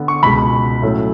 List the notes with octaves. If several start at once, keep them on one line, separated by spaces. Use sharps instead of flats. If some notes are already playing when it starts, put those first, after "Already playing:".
Already playing: D3 B3
C#6
C#2 B2 G#3 B5
A2 F#3 A3 C#4